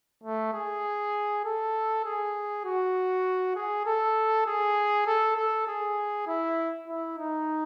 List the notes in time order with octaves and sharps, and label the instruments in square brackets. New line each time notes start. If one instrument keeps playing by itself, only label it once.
[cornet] A3
G#4
A4
G#4
F#4
G#4
A4
G#4
A4
A4
G#4
E4
E4
D#4